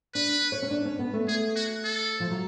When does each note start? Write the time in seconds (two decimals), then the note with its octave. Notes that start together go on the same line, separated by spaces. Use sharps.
0.14 D4 B4
0.52 C#5
0.62 C#4
0.71 D4
0.85 C#4
0.99 B3
1.13 A3
1.28 G#4
1.56 F#4
1.84 A4
2.20 F3
2.30 F#3